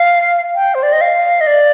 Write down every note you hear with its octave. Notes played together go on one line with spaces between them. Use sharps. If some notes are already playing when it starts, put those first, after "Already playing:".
Already playing: F5
G5
C5
D5
D#5
F5
D#5
D5